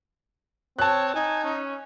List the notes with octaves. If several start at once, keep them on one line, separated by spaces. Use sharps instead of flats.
C4 C#5 A5 F#6
D#4 G#5
C#4